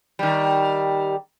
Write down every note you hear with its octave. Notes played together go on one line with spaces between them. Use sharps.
D#3 G3